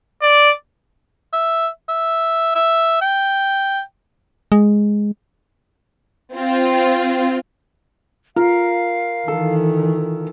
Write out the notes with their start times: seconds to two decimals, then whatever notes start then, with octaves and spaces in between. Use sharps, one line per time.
0.22 D5
1.33 E5
1.88 E5
2.55 E5
3.01 G5
4.52 G#3
6.33 C4 F4
8.36 F4 A#4 F5
9.28 D#3 E3 A4